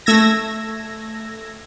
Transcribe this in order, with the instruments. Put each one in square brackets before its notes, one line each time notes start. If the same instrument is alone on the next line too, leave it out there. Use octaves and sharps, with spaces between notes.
[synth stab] A3 E6 G#6 A#6